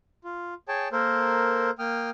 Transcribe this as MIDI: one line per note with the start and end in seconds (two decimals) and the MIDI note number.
0.24 0.54 65
0.68 0.88 68
0.68 0.88 73
0.68 0.88 79
0.68 0.88 81
0.92 1.70 58
0.92 1.70 69
0.92 1.70 70
0.92 1.70 72
1.79 2.10 58
1.79 2.10 79
1.79 2.10 87
1.79 2.10 89